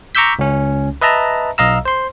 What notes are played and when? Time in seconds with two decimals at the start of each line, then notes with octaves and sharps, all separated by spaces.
0.15 A#5 C#6 D6 E6 G6 B6
0.39 C#2 C#4
1.01 B4 D#5 E5 A5 A#5
1.58 B1 D#5 F5 A#5 E6
1.85 C5 C6